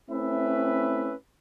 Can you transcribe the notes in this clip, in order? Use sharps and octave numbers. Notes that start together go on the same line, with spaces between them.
A3 C4 C#4 E4 B4 E5